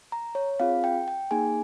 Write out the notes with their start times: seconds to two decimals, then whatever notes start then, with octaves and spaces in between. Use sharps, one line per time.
0.12 A#5
0.35 C#5
0.60 C4 F4 G#4 F5
0.84 G5
1.08 G5
1.31 A#3 D#4 G#4 G#5